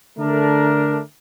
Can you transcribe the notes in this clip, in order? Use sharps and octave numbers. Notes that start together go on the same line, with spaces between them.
D3 A3 D4 A#4